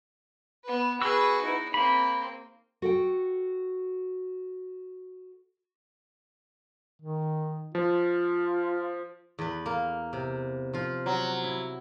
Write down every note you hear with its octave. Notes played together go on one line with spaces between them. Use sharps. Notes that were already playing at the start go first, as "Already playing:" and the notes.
B3 B4
F#4 G#4 B4 E6
D#4 E4
A#3 C4 B5
F#4 A4 G5
D#3
F3 F4
E2 B4
A#3
C3
F3 F4
F#3
E4